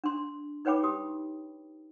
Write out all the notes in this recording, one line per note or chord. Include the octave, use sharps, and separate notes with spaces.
D4 C6
D#4 B4 C#5 G5 B5 D6
G4 D#6